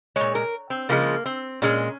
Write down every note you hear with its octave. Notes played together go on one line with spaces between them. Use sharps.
A#2 G#3 C#5
A#4
C4
C#3 F3 G#3 A#3
C4
A#2 G#3 C#4